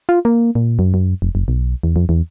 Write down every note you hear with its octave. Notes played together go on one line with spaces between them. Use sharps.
F4
A#3
A#2
F#2
F#2
F1
F#1
B1
E2
F2
E2